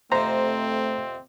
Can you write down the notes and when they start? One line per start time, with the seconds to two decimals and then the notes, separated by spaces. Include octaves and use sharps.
0.12 F2 C3 A3 C4 C5 A#5